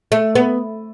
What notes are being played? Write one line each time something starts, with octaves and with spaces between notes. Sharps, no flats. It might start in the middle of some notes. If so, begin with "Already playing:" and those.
A3
B3